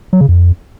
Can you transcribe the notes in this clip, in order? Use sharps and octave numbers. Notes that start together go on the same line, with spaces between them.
F#3
C#3
F2